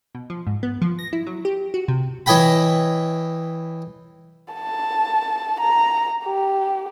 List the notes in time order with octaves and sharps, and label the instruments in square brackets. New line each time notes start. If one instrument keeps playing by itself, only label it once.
[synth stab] B2
F3
G#2
B3
F3
A#6
E4
F#3
G4
F#4
C3
[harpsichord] E3 C#5 D#5 G5 B5
[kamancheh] A5
A#5
G4